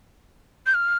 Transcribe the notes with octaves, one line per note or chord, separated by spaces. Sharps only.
G6
F6